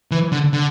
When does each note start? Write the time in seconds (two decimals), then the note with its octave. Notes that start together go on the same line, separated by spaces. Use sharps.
0.11 E3
0.32 D3
0.53 D3